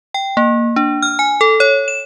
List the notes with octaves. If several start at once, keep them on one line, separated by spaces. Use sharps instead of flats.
G5
A#3
D4
F6
G#5
A4
C#5
E7